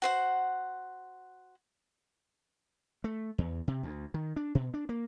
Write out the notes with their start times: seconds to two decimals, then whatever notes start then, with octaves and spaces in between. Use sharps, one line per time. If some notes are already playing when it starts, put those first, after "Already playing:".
0.02 F#4 C5 F#5
3.04 A3
3.38 E2
3.68 C3
3.83 D2
4.14 D#3
4.36 D4
4.55 B2
4.74 D4
4.89 A#3